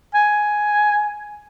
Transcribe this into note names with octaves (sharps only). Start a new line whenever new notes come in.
G#5